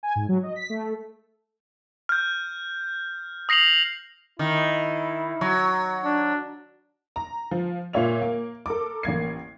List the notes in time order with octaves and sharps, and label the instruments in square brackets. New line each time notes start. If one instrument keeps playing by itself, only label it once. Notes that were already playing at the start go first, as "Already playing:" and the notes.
[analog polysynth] G#5
G#2
F#3
D#5
B6
A3
[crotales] F6 G6
D#6 A#6 C7 F7 F#7
[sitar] D#3 [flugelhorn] E4
[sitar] F#3
[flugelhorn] D4
[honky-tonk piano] A#5
F3
A#2 F4 C#5 E5 F7
A#3
A4 A#4 D6
A1 A#3 G#6 C7